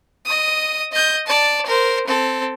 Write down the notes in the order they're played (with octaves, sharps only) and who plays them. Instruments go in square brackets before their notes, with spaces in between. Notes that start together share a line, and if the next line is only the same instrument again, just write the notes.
[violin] D#5 D#6
D#5 G6
D5 A5
A#4 C5
C4 A4